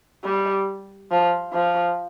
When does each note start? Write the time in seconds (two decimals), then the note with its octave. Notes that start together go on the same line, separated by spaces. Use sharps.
0.25 G3
1.11 F3
1.54 F3